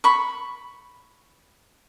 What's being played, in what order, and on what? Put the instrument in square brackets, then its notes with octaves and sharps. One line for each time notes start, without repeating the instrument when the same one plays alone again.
[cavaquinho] B5 C#6